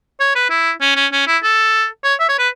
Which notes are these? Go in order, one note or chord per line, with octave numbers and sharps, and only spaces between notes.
C#5
B4
E4
C#4
C#4
C#4
E4
A4
C#5
E5
C#5
B4